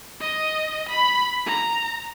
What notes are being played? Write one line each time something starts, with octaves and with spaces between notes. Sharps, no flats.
D#5
B5
A#5